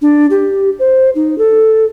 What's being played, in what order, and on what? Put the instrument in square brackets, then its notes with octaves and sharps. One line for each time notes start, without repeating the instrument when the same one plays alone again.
[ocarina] D4
G4
C5
D#4
A4